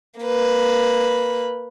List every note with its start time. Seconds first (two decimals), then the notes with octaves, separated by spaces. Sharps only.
0.20 A#3 B4